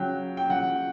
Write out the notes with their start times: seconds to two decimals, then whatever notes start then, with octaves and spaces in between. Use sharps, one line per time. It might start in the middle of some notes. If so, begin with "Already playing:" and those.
Already playing: C#3 F#3 G5
0.37 G5
0.49 C#3 F#3 F#5